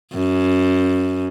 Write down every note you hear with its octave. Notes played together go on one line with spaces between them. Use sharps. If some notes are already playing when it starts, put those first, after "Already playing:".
F#2